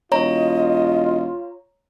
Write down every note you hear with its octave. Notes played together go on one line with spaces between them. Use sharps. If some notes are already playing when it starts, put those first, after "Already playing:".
E1 F4 C#5 D#5 A#5